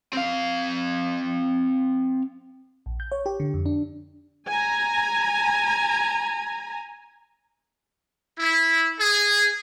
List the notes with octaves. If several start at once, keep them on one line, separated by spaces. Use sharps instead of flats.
C4 F5
A#1
G6
C#5
G4
D3
F2
D4
G#5 A#5
E4
G#4